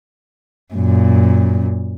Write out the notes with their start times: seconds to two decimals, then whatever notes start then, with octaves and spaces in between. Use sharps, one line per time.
0.74 F#2 A#2